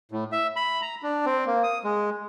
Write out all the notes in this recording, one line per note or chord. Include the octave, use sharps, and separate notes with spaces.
A2
E5
B5
A#5
D4
C4
A#3
D#6
G#3